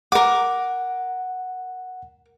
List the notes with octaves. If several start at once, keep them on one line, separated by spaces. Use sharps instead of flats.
A#4 F#5 D6